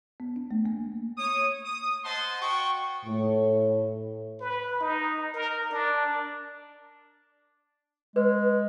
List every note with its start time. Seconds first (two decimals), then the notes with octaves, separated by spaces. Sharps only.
0.20 B3
0.36 D4
0.51 A3
0.66 A#3
1.17 C#5 D#6
1.64 D#6
2.05 C5 D#5 F#5 A5 C6
2.40 F#4 G5 C#6
3.05 A2
4.40 B4
4.80 D#4
5.34 A#4
5.70 D4
8.16 G#3 B4